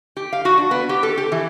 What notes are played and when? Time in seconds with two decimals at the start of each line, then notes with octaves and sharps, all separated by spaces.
0.17 G4
0.33 F5
0.45 F#4
0.57 D4
0.71 B3
0.89 G4
1.03 A4
1.17 G4
1.32 E3